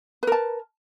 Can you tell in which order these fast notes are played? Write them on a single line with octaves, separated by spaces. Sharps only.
B4 A#4 A5